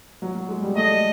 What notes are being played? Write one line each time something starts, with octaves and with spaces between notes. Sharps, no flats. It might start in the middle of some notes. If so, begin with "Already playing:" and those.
F#3
F#3
G#3
G3
A3 D#5